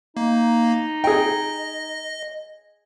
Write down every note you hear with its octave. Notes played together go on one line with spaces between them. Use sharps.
A#3 D#4
G#4 D#5 G5